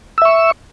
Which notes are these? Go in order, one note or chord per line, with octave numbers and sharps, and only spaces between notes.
E5 C#6 E6